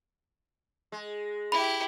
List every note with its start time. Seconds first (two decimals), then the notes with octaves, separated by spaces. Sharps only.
0.92 G#3
1.52 E4 G4 B5